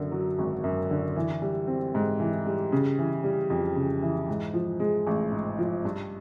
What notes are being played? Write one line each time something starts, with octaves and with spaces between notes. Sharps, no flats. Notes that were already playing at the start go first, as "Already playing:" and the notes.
Already playing: F#2 D3
F#3
G#1
F#2
D3
E3
G3
C4
G#2
E3
G3
C#3
E3
G3
F2
C#3
E3
G#2
F3
G#3
A1
G#2
F3
G2